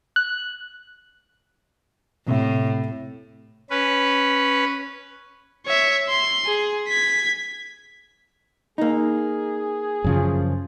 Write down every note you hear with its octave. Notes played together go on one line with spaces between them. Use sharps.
F#6
A2 C3 E5
C#4 B4
C#5 E5
C6
G#4
G#6 B6
A#3 D#4 G#4
F#2 C#3 F3